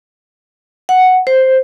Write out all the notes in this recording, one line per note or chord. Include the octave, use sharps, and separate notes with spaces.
F#5
C5